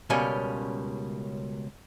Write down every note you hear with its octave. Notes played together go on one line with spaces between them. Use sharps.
C#2 B2 G3 A#3 C#4 G#5